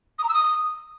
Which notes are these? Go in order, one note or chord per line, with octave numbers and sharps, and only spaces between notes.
D#6
A#5
E6
D#6